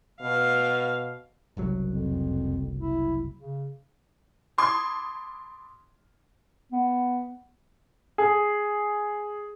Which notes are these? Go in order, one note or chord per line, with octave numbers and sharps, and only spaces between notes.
B2 F5
F#1 C2 F#3
F2
E4
C#3
A5 B5 C6 D6 D#6 G#6
B3
G#4